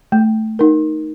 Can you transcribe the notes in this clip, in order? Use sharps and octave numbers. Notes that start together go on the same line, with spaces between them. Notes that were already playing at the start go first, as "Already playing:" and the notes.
A3
D#4 A#4